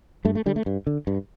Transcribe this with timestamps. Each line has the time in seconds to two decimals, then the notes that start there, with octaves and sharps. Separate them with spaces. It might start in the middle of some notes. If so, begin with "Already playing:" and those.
0.25 G2 A3
0.35 A3
0.46 D3 G3
0.56 A3
0.66 G2
0.87 D3
1.07 G2